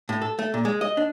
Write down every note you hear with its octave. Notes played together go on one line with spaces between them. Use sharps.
A2
A4
A3
A#2
G#3
D#5
D4